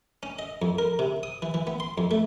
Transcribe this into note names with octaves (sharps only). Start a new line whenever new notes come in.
C#4
D#5
F2
A#4
C3
D#6
E3
E3
B3
C6
F2
A3